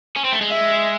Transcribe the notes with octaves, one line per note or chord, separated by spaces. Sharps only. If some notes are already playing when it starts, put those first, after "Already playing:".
C#4
C4
A3
G#3
E5